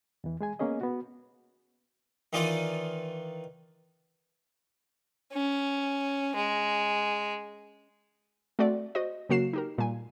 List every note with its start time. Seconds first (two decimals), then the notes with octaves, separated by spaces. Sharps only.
0.24 E2 E3
0.41 G#3 G#4 G#5
0.59 A#3 B3 C#4 G#4 D#5
0.81 B3 F#4
2.33 D#3 E3 D#4 F4 D5 D#6
5.33 C#4
6.35 G#3
8.59 A3 C4 F#4 D5
8.95 F#4 C5 D#5
9.29 C#3 F#3 A#3 F#4 C7 E7
9.53 D#4 G4 A#4
9.78 A#2 G3 G#5